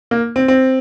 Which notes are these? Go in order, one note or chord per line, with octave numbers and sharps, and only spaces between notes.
A#3
C4
C4